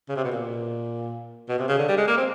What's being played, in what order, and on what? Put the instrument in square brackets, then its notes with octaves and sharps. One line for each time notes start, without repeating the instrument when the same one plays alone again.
[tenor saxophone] C#3
C3
B2
A#2
B2
C3
C#3
D3
G3
G#3
A#3
C4